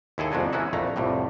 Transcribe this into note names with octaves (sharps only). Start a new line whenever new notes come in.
D#2 E4 G#4 A4
C2 F2 D#3 G#3 D4 D#4
E3 B3 C#4 D#4 E4 F#4
A#1 F2 A3 A#5
C2 F2 A2 G3